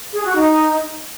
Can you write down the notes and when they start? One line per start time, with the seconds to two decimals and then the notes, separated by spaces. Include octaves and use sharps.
0.12 G#4
0.24 F#4
0.35 D#4